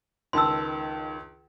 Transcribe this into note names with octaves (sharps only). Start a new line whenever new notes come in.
C#2 D#3 A5 C6 E6